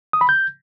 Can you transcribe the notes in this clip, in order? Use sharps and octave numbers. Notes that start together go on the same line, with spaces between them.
D#6
B5
G6